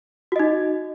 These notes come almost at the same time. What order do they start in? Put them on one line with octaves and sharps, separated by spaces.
F#4 D#5 D#4